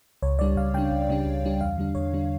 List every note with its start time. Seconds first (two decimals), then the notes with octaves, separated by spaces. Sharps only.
0.22 C#2 C#5
0.39 C#3 G3 D4 D5
0.57 C#2 F5
0.74 C#3 G3 D4 G5
0.92 C#2
1.09 C#3 G3 D4
1.26 C#2
1.44 C#3 G3 D4
1.61 E2 F5
1.78 D3 G3 D4
1.95 E2 C#5
2.13 D3 G3 D4